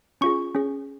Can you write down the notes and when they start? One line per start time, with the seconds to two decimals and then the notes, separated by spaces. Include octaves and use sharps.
0.21 C#4 F4 G#4 C#6
0.55 C#4 G#4